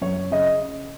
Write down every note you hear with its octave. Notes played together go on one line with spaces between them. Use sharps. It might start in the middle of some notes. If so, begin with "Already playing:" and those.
F#2 C#5
C#3 D#5